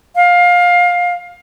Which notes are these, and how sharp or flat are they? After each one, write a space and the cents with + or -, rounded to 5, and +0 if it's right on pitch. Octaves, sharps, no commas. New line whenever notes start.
F5 +20